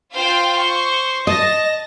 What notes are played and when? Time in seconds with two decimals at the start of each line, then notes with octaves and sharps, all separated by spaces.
0.14 F4 C5 F5 G5
0.57 C#6
1.27 D#5 A5 A#6